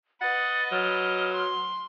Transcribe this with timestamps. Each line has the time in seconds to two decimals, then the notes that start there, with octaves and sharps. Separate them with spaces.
0.21 B4 D#5 F#5 A6
0.72 F#3 F6
1.33 C6